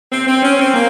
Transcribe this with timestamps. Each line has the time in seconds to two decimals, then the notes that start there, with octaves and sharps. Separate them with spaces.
0.12 C4
0.27 C4
0.43 C#4
0.59 C4
0.74 A#3